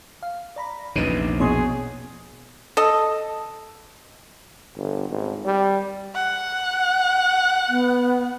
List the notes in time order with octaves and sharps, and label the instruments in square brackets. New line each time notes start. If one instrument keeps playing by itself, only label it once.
[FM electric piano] F5
D5 A#5 B5
[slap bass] A#1 E2 C3 [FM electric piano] C#4 D#4 B4
[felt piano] B2 [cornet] G#4 [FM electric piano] C#5 C6 C#6
[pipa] A4 D#5
[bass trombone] G1
G#1
G3
[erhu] F#5
[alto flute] B3